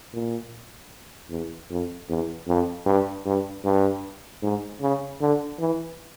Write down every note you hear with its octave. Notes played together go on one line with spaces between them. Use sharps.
A#2
E2
F2
E2
F2
G2
G2
G2
G#2
C#3
D3
E3